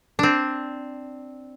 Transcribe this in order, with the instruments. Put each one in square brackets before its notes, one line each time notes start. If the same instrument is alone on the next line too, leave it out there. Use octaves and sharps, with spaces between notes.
[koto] C4 D4